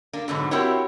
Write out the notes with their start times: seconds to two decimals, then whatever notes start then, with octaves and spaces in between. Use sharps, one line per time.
0.13 A#3 D4
0.28 G#2 B2 D3 F#3
0.51 C4 E4 F#4 G4 A#4 C#5